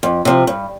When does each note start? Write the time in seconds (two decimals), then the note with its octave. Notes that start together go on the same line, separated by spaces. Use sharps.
0.03 F2
0.25 C3 F3
0.47 G2